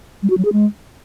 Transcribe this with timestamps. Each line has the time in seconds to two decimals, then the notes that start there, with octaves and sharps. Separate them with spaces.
0.23 G3
0.30 F#4
0.38 F#3
0.45 G#4
0.53 G#3